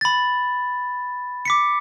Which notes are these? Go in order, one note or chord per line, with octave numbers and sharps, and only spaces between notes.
B5 A6
D6 B6 C#7